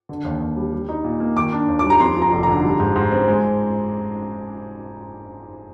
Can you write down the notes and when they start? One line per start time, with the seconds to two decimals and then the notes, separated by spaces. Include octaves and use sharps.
0.09 D3
0.25 D#2
0.41 D#2
0.56 G3
0.72 G3
0.89 D#4
1.04 A#2
1.20 A#3
1.36 D#3 D6
1.52 D4
1.68 D#2
1.79 D6
1.85 G3
1.90 A#5
2.00 F2 C6
2.16 F3
2.22 A#5
2.32 F1
2.43 D3 A#5
2.64 G3
2.80 G#2
2.96 G#2
3.12 C4
3.28 G#3